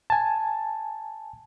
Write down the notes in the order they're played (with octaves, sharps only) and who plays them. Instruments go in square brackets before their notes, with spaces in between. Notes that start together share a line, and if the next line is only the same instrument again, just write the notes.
[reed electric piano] G#5 A5